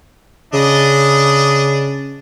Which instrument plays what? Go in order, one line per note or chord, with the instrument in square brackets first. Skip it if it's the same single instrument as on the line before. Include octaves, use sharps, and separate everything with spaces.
[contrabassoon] C#3 [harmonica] D4 D#5